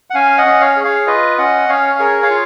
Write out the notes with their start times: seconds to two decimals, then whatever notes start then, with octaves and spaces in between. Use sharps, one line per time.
0.10 F#5
0.14 C#4 F5 G#5
0.38 D#5 F#5
0.45 C#4
0.60 C#5 F5
0.76 G#4
0.84 C#5 F5
1.07 F4 B4 D#5
1.38 C#4 D#5 F#5
1.69 C#4 C#5 F5
1.99 G#4 A#4 C#5
2.22 C#5 F5
2.30 F4